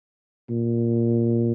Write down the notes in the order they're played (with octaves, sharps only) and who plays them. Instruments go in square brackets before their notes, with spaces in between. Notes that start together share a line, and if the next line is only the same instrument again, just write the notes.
[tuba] A#2